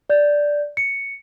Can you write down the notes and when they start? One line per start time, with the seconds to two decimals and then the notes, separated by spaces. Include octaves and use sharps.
0.10 D5 G6
0.77 C#7